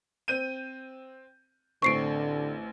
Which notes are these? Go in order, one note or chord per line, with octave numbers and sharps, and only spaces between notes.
C4 G6 D#7
A1 D3 C4 C#6 C7 D7